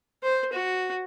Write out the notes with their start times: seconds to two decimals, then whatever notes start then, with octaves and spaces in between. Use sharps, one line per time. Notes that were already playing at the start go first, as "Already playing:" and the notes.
0.23 C5
0.53 F#4